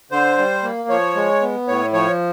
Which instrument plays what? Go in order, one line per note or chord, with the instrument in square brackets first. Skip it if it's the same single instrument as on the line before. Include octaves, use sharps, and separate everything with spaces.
[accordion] D3 C5
G3
A#3
F3 C#5
G#3
B3
A2 C#5
F3 C#5